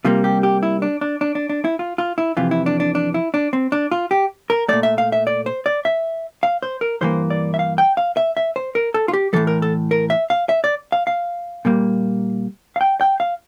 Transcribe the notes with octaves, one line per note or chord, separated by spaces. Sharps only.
C3 G3 A#3 F4
G4
G4
E4
D4
D4
D4
D4
D4
E4
F4
F4
E4
F2 C3 E3 F4
E4
D4
D4
D4
E4
D4
C4
D4
F4
G4
A#4
A#2 A3 D5
E5
F5
E5
D5
C5
D5
E5
F5
C5
A#4
G2 E3 A#3 C5
D5
E5
F5
G5
F5
E5
E5
C5
A#4
A4
F4
G4
A2 E3 G3 A4
A#4
A4
A#4
E5
F5
E5
D5
F5
F5
A#2 G3 A#3
F5
G5
G5
F5